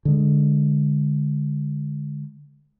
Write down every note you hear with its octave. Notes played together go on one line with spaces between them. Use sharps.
D3 G#3